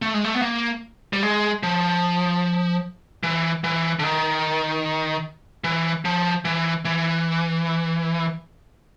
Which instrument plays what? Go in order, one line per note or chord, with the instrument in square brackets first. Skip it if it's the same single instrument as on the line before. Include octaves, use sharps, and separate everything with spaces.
[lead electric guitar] A3
G#3
A3
B3
A#3
G3
G#3
F3
E3
E3
D3
D#3
E3
F3
E3
E3